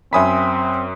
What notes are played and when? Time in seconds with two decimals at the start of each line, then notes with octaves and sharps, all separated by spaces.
0.13 F#2 C4 E5 G#5 B5 D#6 B6